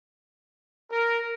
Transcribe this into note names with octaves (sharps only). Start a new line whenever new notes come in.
A#4